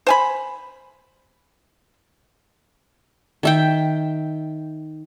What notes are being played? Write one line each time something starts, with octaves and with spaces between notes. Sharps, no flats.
C5 G#5 B5
D#3 E5 G5